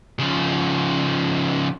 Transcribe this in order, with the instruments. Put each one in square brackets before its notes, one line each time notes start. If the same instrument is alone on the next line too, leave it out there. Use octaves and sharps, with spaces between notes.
[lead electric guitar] C#3 F3